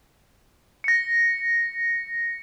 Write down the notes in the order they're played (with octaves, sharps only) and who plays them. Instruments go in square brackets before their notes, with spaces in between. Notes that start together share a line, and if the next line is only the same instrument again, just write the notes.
[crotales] A#6 C#7